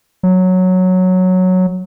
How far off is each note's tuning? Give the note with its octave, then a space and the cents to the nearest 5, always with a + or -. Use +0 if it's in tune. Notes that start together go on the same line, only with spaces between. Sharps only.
F#3 -5